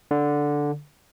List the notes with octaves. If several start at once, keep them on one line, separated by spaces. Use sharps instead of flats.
D3